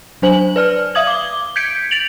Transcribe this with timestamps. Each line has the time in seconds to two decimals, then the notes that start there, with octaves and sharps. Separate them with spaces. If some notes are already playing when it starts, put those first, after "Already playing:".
0.22 F#3 D4 C5 G#5 F#7
0.56 B4 D5 F6
0.95 E5 F5 D#6 G#6 F#7
1.07 D6 G7
1.56 G6 G#6 B6 C#7 D7
1.91 A6 D7 F7 F#7